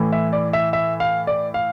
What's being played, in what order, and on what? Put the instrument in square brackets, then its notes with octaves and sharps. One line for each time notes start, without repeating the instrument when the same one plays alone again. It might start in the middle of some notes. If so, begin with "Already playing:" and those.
Already playing: [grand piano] A2 E3
E5
D5
E5
E5
F5
D5
F5